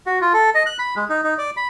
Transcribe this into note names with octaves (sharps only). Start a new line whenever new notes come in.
F#4
F4
A4
D#5
F#6
B5
G#3
D#4
D#4
D5
B5